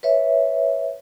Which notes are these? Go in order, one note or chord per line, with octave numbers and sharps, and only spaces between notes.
B4 C#5 E5